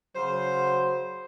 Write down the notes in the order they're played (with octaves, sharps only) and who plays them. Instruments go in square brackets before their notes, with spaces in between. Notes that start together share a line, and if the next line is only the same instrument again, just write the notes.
[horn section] C#3 F#3 C5